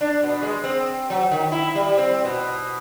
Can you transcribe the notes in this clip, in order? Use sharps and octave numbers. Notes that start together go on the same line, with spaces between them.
D4
B2
G#3
C4
F#3
D#3
E4
G3
C4
B2